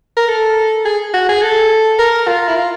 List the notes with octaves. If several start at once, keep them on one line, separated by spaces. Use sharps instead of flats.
A#4
A4
G#4
F#4
G#4
A4
A#4
F4
E4
F4